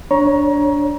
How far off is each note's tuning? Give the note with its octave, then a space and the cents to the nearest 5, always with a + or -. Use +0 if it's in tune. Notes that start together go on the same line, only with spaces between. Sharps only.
D4 -10 C#5 +0 A#5 +25